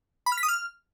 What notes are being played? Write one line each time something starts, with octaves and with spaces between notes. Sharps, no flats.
B5
F6
B6
D#6
F6